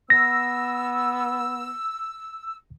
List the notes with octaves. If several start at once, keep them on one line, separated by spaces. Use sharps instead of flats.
B3 E6 A#6